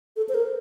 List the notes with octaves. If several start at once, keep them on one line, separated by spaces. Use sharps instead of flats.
A4
C5
A#4